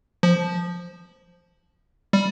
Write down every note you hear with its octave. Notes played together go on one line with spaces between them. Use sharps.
F3
G3